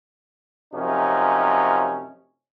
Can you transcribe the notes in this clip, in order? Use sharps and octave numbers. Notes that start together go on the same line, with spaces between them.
F#2 C3 F3 A3 C#4 D#4